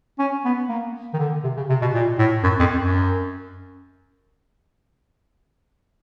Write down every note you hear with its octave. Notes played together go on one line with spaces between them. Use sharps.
C#4
B3
A#3
D#3
D3
C3
C#3
C3
B2
A#2
A2
F#2
F2
F#2